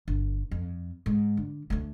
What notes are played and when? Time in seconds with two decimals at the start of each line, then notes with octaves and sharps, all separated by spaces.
0.08 G1
0.51 F2
1.06 G#2
1.37 D3
1.70 D2 A3